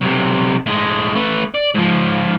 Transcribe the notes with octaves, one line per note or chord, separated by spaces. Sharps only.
B1 C3
A2 G#3
A3 B4
D5
G#2 F3